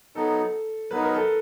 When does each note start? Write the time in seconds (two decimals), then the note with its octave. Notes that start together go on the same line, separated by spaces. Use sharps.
0.15 F#3 B3 D#4 A4
0.91 F#3 B3 D#4 B4
1.03 A#4
1.15 A4